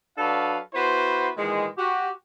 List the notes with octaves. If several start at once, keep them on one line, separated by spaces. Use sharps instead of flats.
F#3 D4 F#4 A4 B4 F5
B3 E4 F#4 B4 C5
A#2 D#3 E3 G#3
F#4 G4